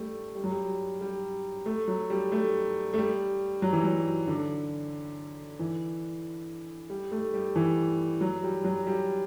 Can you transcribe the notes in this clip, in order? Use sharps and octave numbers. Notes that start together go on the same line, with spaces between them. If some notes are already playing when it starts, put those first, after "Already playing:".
Already playing: G3 A3
G3
F#3
G3
G3
A3
F#3
G3
A3
A3
G3
F#3
E3
F#3
D3
E3
G3
A3
G3
E3
F#3
G3
F#3
G3